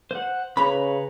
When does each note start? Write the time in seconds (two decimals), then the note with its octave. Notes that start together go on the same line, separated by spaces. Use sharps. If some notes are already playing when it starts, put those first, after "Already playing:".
0.11 C5 F#5
0.57 C#3 B4 C#5 A#5 B5